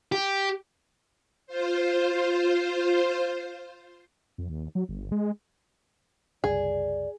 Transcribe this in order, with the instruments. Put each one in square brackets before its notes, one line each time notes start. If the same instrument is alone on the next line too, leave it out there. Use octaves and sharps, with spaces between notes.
[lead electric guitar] G4
[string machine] F4 C5
[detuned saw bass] F2
D#2
F#3
G1
G#3
[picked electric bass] F#1 C2 [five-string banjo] G#4 [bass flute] D5